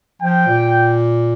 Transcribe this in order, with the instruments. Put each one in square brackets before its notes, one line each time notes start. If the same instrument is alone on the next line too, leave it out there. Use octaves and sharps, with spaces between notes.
[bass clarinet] F3 [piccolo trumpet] G5
[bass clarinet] A#2